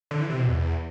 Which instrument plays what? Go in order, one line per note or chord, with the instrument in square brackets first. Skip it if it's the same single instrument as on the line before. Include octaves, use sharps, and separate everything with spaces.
[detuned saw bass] D3
E3
C3
B2
E2